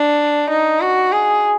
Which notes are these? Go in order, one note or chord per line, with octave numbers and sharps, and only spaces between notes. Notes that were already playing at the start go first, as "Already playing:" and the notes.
Already playing: D4
D#4
F#4
G#4